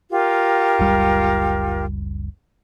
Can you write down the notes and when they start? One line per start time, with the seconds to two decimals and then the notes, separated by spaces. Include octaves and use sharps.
0.11 F4 G4 A#4
0.79 F#1 C#2 G3